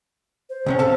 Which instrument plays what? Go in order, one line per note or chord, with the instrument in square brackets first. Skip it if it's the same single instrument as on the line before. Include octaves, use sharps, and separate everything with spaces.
[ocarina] C5
[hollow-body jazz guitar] C#2 C3 C#4
A4 F5 A5